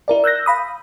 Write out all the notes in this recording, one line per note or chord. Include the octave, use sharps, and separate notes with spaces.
E4 A#4 D5
E6 F#6 G6 A#6
F5 B5 D#6